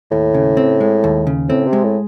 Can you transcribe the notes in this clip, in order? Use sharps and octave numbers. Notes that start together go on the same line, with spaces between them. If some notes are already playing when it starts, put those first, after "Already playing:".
D#2 A2
C#3
C4
G#3
D#2
C#3
A2 C4
C3
G#3
A2